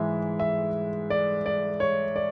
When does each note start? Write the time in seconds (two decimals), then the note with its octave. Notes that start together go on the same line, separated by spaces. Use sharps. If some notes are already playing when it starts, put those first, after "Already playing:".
Already playing: G#2 E3 G#3 E5
0.40 E5
1.10 D5
1.46 D5
1.80 C#5
2.16 D5